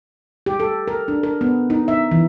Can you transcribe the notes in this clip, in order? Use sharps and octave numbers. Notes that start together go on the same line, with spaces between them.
G4
A4
A#4
D4
A#4
B3
D#4
E5
E3